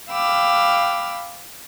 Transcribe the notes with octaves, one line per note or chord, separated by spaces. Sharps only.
F5 G5 B5 D6 E6 F6